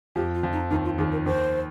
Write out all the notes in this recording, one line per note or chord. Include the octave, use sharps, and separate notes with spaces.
F2 F3 G4
F4
F2 F3
D#4
D#2 D#3 D#4
F4
D#2 D#3 G#4
A#4
D#2 D#3 C5